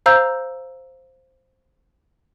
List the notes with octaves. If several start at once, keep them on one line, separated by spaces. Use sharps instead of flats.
C5 F5 A#5 E6 G6